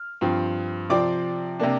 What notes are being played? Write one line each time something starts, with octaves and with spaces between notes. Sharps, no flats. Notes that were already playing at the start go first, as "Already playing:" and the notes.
Already playing: F6
G2 F3 C4
C3 F3 C4 D5 D6
C3 A#3 D4